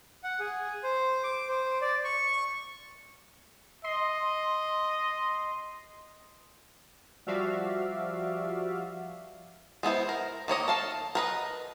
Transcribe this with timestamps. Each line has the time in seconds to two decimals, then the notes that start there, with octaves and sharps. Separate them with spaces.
0.23 F#5
0.40 G#4
0.83 C5
1.23 D6
1.49 C5
1.82 D5
2.04 C#6
3.84 D#5 C6
7.26 F3 G3 F#4 D5 E5 F5
9.83 G#3 B3 E4 C5
10.09 A#4
10.48 D#3 A#3 C#5 D#5
10.68 A4 F5 A5
11.15 A#4 B4 D#5